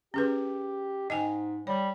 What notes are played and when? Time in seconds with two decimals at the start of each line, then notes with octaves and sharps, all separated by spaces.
0.14 C#4 G4 G#4 B4
1.10 G#2 D#5 G5 G#5
1.67 G3 C#5